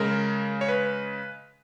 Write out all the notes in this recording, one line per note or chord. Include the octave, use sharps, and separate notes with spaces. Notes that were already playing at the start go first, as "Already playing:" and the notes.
Already playing: C#3 G#3 A#4
C#5
B4